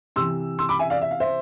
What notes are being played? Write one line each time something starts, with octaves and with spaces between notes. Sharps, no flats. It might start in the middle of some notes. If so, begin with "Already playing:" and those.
C3 E3 C6 E6
C6 E6
B5 D6
E5 G#5
D5 F5
E5
F5
C5 E5